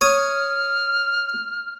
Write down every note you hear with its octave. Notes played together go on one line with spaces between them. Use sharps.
C#5 D#6 F6